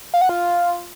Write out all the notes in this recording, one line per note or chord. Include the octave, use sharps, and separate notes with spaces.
F5
F#5
F4